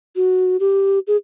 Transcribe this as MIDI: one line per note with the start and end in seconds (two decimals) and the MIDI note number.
0.16 0.57 66
0.60 0.99 67
1.07 1.16 68